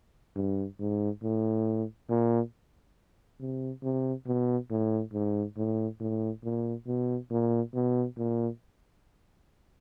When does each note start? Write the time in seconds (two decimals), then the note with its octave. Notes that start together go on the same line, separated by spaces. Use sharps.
0.36 G2
0.80 G#2
1.23 A2
2.10 A#2
3.40 C3
3.83 C3
4.27 B2
4.71 A2
5.14 G#2
5.57 A2
6.00 A2
6.44 A#2
6.87 B2
7.31 A#2
7.75 B2
8.18 A#2